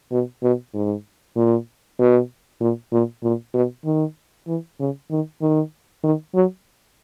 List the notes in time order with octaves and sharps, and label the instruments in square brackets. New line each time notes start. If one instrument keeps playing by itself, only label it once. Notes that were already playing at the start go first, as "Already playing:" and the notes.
[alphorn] B2
B2
G#2
A#2
B2
A#2
A#2
A#2
B2
D#3
E3
C#3
D#3
D#3
D#3
F#3